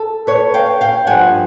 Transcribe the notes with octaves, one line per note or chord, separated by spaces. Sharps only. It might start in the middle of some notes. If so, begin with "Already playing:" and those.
Already playing: A4
B4 C#5
F5 G5
F5 G5
G2 D3 F3 F#5 G#5